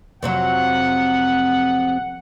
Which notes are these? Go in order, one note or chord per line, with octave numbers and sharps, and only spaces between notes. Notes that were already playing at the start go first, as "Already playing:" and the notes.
F2 C3 F#3 F#5